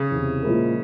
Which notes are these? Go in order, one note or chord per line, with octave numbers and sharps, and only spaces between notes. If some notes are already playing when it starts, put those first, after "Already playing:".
Already playing: C#3
E2 C3 E3
A#2 F3 G#3 E4 A#4